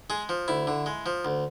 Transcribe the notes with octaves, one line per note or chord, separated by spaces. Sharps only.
G#3 G#4
F3
D2 E4
D3
G#3
F3
D2